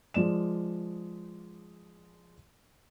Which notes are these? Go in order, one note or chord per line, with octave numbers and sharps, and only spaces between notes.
F3 G#3 D5 E7